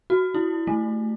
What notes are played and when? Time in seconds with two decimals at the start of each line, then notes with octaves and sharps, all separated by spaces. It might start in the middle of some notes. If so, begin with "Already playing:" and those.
0.10 F#4
0.34 E4
0.67 A3